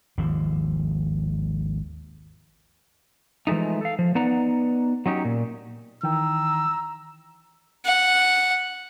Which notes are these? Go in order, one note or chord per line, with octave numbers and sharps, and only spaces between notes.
G#1 D#2 F3
E3 F3 G#3 A3 D#4
A4 F5
F3
B3 D#4 B4 D5 F#5 A#5
F#3 C#4 D#4 G4
A#2
D#3 E3 G5 A#5 E6
F#5